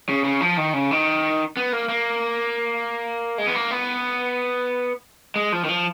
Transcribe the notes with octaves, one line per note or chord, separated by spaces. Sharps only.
C#3
C#3
F3
D#3
C#3
D#3
B3
A#3
A#3
G#3
B3
A#3
B3
G#3
F3
D#3
F3